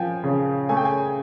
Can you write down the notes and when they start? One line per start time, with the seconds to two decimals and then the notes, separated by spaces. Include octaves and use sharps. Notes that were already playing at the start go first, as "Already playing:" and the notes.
Already playing: F3 G5 G#5
0.24 C#3
0.69 A3 G#5
0.77 G5
0.85 G#5